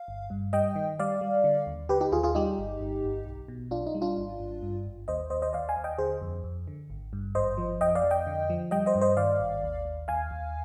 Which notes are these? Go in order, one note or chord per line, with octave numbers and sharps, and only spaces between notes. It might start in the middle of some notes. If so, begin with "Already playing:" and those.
Already playing: F5
G1
G2
G3 D#5 G5
D#3
G3 D5 F5
G3
D3
D#2
D3 G4 B4
D#4 G4
D#2 F4 G#4
F4 G#4
G3 D#4 G4
G1
G1
G1
B1
B2
B1 D4 F4
D#4
G3
D4 F4
G#1
G#1
G2
G#1
D#2 C5 D#5
D#2 C5 D#5
C5 D#5
D#2 D5 F5
F5 G#5
D#2
D#5 G5
D3 G#4 C5
F2
F2
D3
G#1
G2
G#1 C5 D#5
F3
F2 D#5 G5
D5 F5
F2
D#5 G5
D3
F3
G3 D#5 G5
C5 D#5
G2
C5 D#5
D#3 D5 F5
G#1
D#2
D#2
D#2 F5 G#5
D#2